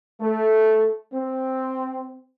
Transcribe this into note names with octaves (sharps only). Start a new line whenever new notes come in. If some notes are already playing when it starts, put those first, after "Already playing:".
A3
C4